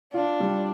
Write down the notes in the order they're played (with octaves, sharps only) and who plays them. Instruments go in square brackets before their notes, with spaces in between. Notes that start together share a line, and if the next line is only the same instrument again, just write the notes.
[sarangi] D4 [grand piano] F4
[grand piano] G3